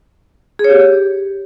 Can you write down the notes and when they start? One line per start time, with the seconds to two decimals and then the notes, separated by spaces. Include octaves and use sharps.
0.59 G#4
0.64 C#5
0.70 G4